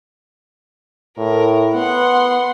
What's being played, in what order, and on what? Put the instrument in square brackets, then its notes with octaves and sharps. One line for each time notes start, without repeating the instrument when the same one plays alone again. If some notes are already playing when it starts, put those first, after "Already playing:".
[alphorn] A2 [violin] A#4
[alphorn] B3 [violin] F#5 C6